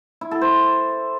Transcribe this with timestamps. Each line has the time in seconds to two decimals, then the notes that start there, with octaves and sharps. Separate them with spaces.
0.21 E4
0.31 A4
0.41 C5